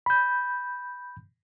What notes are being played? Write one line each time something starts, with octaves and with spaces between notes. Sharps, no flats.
B5 G6